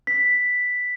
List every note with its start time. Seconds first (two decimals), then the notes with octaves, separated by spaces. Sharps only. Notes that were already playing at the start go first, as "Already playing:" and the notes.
0.07 B6